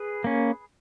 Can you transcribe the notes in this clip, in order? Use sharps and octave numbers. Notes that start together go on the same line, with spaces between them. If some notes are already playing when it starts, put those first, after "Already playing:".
Already playing: G#4 B4
A#3 C#4